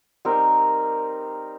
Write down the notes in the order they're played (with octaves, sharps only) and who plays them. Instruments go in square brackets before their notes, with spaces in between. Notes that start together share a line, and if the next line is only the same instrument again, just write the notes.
[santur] G3 C4 D#4 A#4